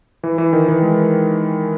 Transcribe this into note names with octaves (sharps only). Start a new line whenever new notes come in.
E3
E3
D#3
E3
G#3